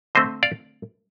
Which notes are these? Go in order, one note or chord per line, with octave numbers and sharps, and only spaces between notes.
D3 A3 C4 C5 D#5
D5 F5